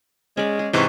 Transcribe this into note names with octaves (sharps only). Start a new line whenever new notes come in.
G#3 C#4 D5
G#4
G#2 C3 E3 C5 D#5 C#6